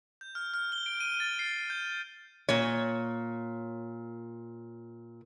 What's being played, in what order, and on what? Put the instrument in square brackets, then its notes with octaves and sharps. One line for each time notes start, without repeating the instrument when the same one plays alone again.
[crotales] G6
F6
F6
G7
D7
D#7
A6
C7
G6
[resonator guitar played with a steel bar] A#2 C#5